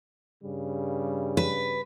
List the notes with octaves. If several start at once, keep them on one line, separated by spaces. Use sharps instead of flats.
G2 C#3 G3
B4